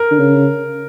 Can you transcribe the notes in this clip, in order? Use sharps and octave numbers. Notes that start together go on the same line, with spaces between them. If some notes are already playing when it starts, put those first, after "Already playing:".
Already playing: A#4
D3
C#3